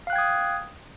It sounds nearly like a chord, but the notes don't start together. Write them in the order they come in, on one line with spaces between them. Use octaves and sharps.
F5 F#6 G5 G#6 D#6